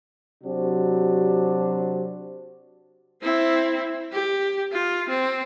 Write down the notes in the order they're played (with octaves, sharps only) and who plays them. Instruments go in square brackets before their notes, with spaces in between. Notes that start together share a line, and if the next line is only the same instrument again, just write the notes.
[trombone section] C3 F#3 C4 D4 F#4 G4
[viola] C4 E4
G4
F4
C4